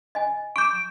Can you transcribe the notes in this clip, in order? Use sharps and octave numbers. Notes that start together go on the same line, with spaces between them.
D#5 G#5
C#6 D6 G6 D7